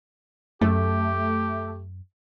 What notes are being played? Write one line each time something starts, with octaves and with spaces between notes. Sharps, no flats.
F#2 A3 G4